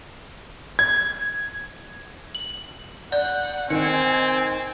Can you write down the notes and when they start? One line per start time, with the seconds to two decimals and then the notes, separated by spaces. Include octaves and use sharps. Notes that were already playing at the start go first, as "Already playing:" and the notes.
0.79 G#6
2.35 F#7
3.12 D5 F#5 G6
3.70 D#3 C4 D#4 G#5 C#7